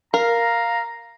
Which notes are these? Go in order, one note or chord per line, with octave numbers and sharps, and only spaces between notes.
A#4 F5 A#5